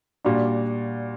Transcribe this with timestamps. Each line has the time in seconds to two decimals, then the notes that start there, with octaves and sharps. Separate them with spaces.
0.25 A#2 G3 D4 F#4